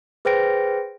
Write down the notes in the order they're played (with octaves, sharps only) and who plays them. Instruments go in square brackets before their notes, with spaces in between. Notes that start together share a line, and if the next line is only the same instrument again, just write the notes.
[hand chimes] G#4 B4 C5 G5 A#6 D7